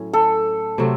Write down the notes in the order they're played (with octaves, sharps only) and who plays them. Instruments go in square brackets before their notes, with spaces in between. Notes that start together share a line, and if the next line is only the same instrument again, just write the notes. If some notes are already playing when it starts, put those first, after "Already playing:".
Already playing: [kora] A2 F#3 C#4
[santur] A4
[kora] C3 F#3 A3 C4